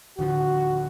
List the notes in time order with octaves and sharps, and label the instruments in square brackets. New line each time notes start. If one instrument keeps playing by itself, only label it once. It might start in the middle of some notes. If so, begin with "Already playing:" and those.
[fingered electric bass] D1 D3 F3 [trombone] F#4